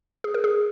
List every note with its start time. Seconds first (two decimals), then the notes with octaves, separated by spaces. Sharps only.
0.24 G#4
0.34 A#4
0.44 G#4